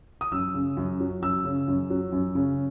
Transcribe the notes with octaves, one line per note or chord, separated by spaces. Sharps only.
D#6
F#2 E6
C#3
F#2
F#3
F#2 E6
C#3
F#2
F#3
F#2
C#3